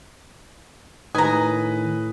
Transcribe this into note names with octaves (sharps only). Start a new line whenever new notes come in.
A2 D#3 B4 G#5 A#5 D#6